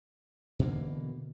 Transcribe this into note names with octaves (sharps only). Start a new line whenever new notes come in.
B2 D3 E3 A#3